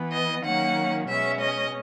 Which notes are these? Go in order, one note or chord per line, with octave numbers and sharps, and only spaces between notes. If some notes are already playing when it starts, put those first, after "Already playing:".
Already playing: E3 B3
D#5
D#3 F#3 A#3 C#4 F#5
B2 G#3 C#4 E5
D#5